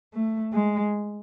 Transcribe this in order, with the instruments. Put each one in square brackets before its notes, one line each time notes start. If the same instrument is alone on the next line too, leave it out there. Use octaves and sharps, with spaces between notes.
[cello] A3
G#3